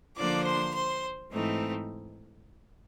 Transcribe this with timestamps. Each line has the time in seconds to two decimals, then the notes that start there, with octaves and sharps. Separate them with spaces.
0.17 D3 F3 A#3 D4 D5 D6
0.46 C5 C6
0.75 C5 C6
1.32 G#2 E3 A3 C4 D#4